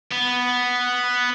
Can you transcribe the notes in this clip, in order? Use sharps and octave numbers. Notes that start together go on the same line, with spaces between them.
B3